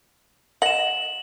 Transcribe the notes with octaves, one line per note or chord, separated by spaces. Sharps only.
D#5 F#5 E7 F#7